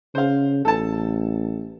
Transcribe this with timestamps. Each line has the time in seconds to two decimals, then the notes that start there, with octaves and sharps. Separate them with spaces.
0.15 C#3 C5 F5
0.65 A1 A4 A5